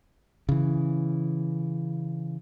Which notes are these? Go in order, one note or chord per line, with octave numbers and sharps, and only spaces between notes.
C#3 E3